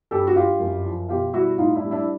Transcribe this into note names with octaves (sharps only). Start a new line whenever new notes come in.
G2 G4 A4
F#4
G2 F4 G4
F#2
F3
B2 F4 G4
G3 E4 F#4
A2 D#4 F4
D4 E4
G3
D4 E4